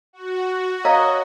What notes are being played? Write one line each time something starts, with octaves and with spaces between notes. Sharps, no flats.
F#4
A#4 C#5 D#5 F5 A#5